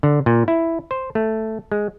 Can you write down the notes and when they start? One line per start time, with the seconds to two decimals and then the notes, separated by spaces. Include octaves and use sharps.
0.03 D3
0.26 A#2
0.48 E4
0.91 C5
1.15 A3
1.72 G#3